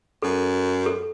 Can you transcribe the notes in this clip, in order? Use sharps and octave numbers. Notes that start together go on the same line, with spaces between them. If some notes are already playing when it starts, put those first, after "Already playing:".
F#2 A4
A4